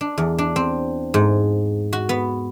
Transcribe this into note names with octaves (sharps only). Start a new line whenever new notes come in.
D4
E2
D4
C4
G#2
F#4
B3